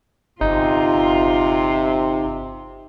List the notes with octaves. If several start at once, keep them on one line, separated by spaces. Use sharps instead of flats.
G1 C3 D#4 F4